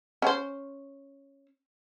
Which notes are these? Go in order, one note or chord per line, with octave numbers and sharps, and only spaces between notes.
C#4 C5